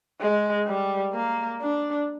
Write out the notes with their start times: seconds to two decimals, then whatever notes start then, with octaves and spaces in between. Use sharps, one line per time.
0.21 G#3
0.67 G3
1.14 A#3
1.61 D4